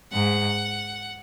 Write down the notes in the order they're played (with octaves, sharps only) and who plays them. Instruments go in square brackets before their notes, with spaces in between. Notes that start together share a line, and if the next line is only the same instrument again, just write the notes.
[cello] G#2 [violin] F#5